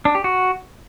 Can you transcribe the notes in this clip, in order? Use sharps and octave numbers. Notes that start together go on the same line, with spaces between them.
D4
G4
F#4